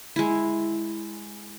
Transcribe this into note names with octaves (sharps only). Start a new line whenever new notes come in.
G#3 E4